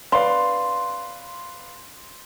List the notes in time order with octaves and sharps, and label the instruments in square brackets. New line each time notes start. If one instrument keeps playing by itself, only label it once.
[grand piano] B4 D5 F5 [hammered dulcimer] C6